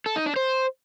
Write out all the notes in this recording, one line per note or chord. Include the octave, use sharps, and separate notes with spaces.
A4
D#4
D4
C5